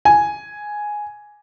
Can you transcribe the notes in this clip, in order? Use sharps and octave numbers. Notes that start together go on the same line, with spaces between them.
G#5